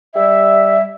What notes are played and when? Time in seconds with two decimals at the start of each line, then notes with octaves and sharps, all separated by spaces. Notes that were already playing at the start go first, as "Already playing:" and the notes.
0.15 G3 E5